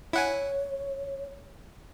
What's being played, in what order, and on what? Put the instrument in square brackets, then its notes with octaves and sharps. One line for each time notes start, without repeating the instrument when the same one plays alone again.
[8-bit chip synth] E4 F#5 G#5 [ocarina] C#5